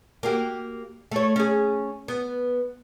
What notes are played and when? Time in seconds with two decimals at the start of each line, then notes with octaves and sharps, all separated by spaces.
0.23 A#3 F#4 G4
1.11 A3 C#5
1.36 C#4 G#4
2.08 B3